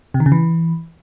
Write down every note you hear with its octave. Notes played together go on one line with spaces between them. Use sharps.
C3
D#3
C#3
E3